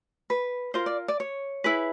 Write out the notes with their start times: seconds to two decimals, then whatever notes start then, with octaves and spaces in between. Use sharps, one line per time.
0.30 B4
0.74 F4 A#4 C5
0.86 D5
1.08 D5
1.20 C#5
1.64 E4 G#4 B4